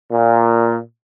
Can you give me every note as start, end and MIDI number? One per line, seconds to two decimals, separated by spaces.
0.11 0.77 46